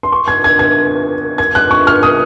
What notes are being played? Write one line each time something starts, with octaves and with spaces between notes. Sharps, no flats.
C6
C#6
G#6
G#6
G#6
G#6
F#6
C#6
F6
D#6